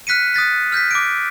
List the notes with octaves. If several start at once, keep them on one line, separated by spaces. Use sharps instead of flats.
F6 F#6 B6 C#7 D#7
D#6 F#6 A6 B6
F6 G6 A#6 B6
D6 D7